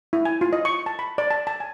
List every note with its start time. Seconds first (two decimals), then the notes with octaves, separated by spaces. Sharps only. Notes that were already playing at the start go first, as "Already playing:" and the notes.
0.13 E4
0.25 G#5
0.41 F4
0.53 D#5
0.65 C#6
0.86 A5
0.99 B5
1.18 D5
1.31 A5
1.47 A5
1.60 G#5